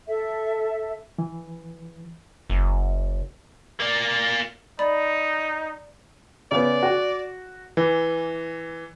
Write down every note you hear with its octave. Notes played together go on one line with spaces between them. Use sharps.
A4 E5
E3
F#1
A#3 D5
D#4 D5 B5
C#3 B3 D5
F#4
E3